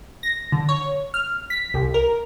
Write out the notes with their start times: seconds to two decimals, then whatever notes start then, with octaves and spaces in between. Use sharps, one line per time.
0.23 A#6
0.52 D3
0.69 C#5
1.14 F6
1.50 B6
1.74 C2
1.94 A#4